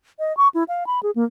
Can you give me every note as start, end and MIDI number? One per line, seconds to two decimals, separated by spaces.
0.19 0.35 75
0.37 0.48 85
0.55 0.64 64
0.69 0.87 77
0.87 1.00 83
1.03 1.11 68
1.16 1.24 58